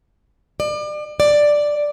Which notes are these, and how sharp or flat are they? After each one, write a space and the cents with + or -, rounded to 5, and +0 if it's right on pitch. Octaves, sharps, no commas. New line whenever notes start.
D5 +35
D5 +5